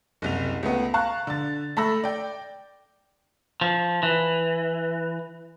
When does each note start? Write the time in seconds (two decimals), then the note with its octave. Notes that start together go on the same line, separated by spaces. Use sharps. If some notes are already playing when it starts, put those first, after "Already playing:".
0.22 F#1 C2 F7
0.63 C#2 A3 B3
0.94 F5 A5 A#5 C#6 F#6
1.27 D3 A6
1.77 A3 A4 B5 E6 A#6
2.04 D5 G5
3.61 F3
4.03 E3